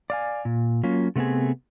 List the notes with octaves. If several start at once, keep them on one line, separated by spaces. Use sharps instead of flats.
D5 F5 G#5
A#2
F#3 A#3 C#4 F4
C3 A3 B3 C4 G#4